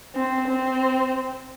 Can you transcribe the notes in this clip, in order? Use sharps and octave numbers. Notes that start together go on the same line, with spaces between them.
C4
C4